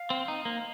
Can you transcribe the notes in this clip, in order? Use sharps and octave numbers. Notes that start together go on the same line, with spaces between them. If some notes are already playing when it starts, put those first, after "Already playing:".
Already playing: F5
C4
D#4
A#3